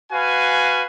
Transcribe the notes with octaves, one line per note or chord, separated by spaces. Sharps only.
F#4 B4 F5 G#5